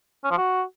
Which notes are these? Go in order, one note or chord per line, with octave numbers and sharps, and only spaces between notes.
C#4
F3
F#4